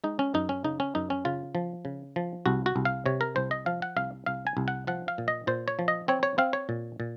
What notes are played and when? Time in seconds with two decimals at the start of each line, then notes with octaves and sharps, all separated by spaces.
0.04 G#3 D#4
0.19 C#4
0.34 F#2 D#4
0.49 C#4
0.64 C#3 D#4
0.80 C#4
0.95 F#2 D#4
1.10 C#4
1.25 C#3 F4
1.55 F3
1.85 C#3
2.16 F3
2.46 C2 F#4
2.66 F#4
2.76 C2
2.85 F5
3.06 C3 C#5
3.21 A#4
3.36 C2 C5
3.51 D#5
3.66 F3 F5
3.82 F#5
3.96 C2 F5
4.26 C2 F5
4.47 G#5
4.57 C2
4.68 F#5
4.87 F3 F#5
5.08 F5
5.18 A#2
5.28 D#5
5.47 A#2 C5
5.68 C#5
5.79 F3
5.88 D#5
6.08 C4 C#5
6.23 C#5
6.38 C4 F5
6.53 C#5
6.69 A#2
7.00 A#2